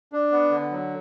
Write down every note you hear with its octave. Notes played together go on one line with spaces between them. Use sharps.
D4
B3
D3
F#3